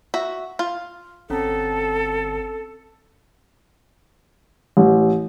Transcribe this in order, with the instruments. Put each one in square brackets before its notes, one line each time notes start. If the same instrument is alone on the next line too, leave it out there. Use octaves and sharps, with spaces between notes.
[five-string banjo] F#4 E5
F4
[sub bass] G1 [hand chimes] C4 C#4 A#5 [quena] A4
[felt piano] A1